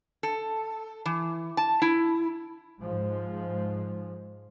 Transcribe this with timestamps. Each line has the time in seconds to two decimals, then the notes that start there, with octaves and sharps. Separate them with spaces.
0.23 A4
1.06 E3
1.57 A5
1.82 E4
2.82 G#2 F3 G#3